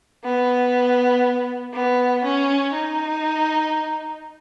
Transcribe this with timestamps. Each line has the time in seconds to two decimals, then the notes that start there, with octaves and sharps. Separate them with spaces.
0.24 B3
1.73 B3
2.24 C#4
2.73 D#4